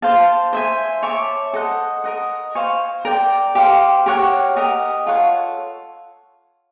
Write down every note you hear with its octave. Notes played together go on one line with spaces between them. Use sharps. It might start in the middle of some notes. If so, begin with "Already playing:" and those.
C5 F5 A5
C5 E5 G#5
C#5 E5 A5 D6
A4 C5 D#5 F#5
A#4 D#5 F#5
C5 F5 G#5 C#6
A#4 D5 G5
G4 C5 F5
G4 A#4 C#5 F#5
G4 A#4 D#5 F#5
F4 A4 C#5 F#5